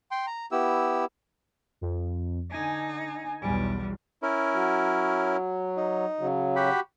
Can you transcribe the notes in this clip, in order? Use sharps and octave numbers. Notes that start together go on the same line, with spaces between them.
G5 C6
A#5
B3 E4 G4 E6
F2
D3 D#4 G#5
B1 E2 G3
C#4 E4 A#4
F#3
D#4
C#3 F#3
F#4 G4 B5